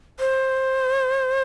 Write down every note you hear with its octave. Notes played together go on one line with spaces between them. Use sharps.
C5